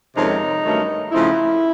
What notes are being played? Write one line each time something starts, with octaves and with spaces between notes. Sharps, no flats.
F2 C3 D#3 G#3 C#4 D#4
G2 D#3 F#3 A3 C#4
C#3 F3 A3 C4 D#4 E4